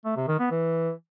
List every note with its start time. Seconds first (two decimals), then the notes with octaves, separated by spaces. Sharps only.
0.05 A3
0.16 C3
0.28 D#3
0.39 B3
0.51 E3